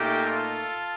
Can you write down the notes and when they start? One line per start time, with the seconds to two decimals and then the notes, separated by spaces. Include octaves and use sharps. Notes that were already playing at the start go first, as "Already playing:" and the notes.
Already playing: A#2 A3 D#4 G4
0.25 F4 A4